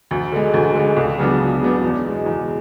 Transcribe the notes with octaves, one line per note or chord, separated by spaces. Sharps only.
D2
D3 G#3
D2
D3 G#3
C#2
C#3 F#3 B3 D4
C#2
C#3 F#3 B3 D4
E2
B2 G#3
E2